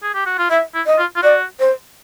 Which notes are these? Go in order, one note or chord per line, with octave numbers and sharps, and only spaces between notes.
G#4
G4
F#4
F4
E4 E5
E4
D#5
F4
F4
F#4 D5
C5